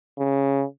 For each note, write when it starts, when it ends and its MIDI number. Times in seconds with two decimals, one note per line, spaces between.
0.18 0.64 49